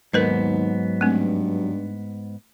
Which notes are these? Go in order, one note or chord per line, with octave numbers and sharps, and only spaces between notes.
D#2 G#2 F#3 B3 A#4 B4 D#5
G2 A3 C4